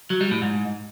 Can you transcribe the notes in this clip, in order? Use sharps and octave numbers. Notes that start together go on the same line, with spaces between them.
F#3
G3
A2
G#2